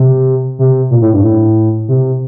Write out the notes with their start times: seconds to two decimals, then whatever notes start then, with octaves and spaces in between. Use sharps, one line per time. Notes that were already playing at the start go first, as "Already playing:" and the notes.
Already playing: C3
0.59 C3
0.91 A#2
1.01 A2
1.13 G2
1.23 A2
1.88 C3